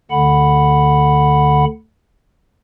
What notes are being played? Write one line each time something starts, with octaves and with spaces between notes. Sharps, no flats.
D2 D3 F#5 B5